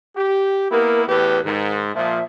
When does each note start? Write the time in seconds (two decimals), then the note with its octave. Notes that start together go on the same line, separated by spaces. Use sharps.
0.17 G4
0.71 A#3 B3 E4 A#4
1.08 E2 A2 G4 B4
1.45 G#2 D#3
1.95 A#2 F3 E5